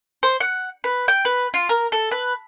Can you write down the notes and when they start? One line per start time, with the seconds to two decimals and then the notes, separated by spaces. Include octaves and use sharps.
0.23 C5
0.40 F#5
0.84 B4
1.08 G5
1.25 B4
1.54 F4
1.69 A#4
1.92 A4
2.11 B4